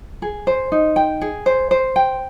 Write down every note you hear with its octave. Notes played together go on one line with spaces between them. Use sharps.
G#4
C5
D#4
G5
G#4
C5
C5
G5